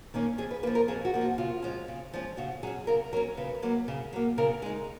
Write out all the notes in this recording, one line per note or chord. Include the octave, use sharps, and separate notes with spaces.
D#3 A#3 C#4
F2 G#4
B4
F3 A#3 B4
A#4
F2 G#4
F#4
F3 A#3
F#4
C#3 F4
F3 G#3 C#4
C#3
F3 G#3 C#4
C#3 F#4
F#3 C#4 G#4
C#3 A#4
F#3 C#4 A#4
C#3 B4
F#3 A#3
C#3
F#3 A#3
C#3 A#4
G#3 D#4 G#4